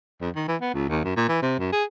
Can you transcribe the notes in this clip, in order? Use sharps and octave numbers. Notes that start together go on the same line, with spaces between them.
F2
D#3
E3
B3
C#2
D#2
F#2
A#2
E3
C3
F#2
G#4